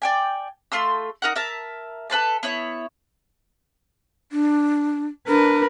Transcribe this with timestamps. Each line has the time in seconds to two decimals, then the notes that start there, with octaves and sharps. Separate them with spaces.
0.02 D5 G5 G#5
0.72 A3 F4 C6 E6
1.22 D#4 A#4 F#5
1.36 A#4 E5 A5
2.10 A4 B4 C5 A5
2.43 B3 E4 C#5
4.32 D4
5.28 D4 A#4 B4